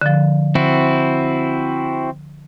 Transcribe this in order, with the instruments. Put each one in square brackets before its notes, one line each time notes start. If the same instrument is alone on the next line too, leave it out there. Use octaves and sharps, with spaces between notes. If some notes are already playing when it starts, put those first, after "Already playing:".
[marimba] D3 F3
[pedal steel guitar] C4 E4 F#4